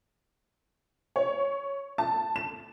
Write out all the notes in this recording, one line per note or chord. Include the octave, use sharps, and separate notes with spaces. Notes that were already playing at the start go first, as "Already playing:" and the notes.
C#5
A5
E7